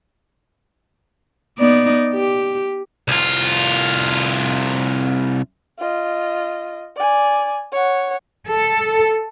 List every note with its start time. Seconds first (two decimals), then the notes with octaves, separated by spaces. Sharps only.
1.59 B3 D#4 D5
2.14 G4
3.08 C2 F4
5.79 F4 D#5
6.96 D5 G#5
7.73 C#5 F#5
8.48 A4